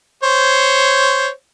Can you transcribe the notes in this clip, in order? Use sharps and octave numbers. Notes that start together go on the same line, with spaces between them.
C5 C#5